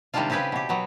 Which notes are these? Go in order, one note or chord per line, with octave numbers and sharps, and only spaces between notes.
C3 D#3 G3 G#3 D4 F4
C#3 C4 G4 G#4 B4
B2 G4
F#3 B3